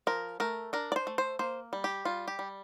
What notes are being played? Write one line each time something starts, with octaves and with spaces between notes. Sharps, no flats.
F3 A#4
A3 A#4
D4 A#4
D5
C5
A3
C5
A#3 C5
G3
G4
G3 F4
G4
G3